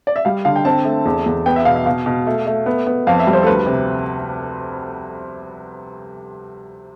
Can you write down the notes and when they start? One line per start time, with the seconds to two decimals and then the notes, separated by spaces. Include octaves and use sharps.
0.07 D5
0.16 E5
0.25 G3 F5
0.45 D3 F5
0.56 G5
0.65 C4 A5
0.85 A3
1.05 E2
1.26 E2
1.46 B3 G5
1.56 E5
1.65 B2 F5
1.76 E5
1.86 B2 F5
2.06 B2
2.27 A3
2.47 A3
2.66 B3
2.87 B3
3.07 F2 F5
3.20 E5
3.27 G3
3.33 C5
3.43 A4
3.46 D2 B4
3.66 C3